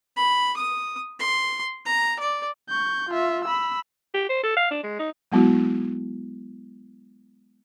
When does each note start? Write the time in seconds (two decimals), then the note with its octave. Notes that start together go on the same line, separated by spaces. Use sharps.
0.17 B5
0.57 D#6
1.20 C6
1.85 A#5
2.20 D5
2.70 C#6 G6
3.10 F4 E5
3.45 B5 E6
4.14 G4
4.29 C5
4.43 A4
4.57 F5
4.71 D4
4.83 G#3
4.99 D#4
5.32 F#3 G#3 B3 E4 F#4